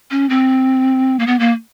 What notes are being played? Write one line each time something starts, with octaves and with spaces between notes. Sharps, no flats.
C#4
C4
A#3
B3
A#3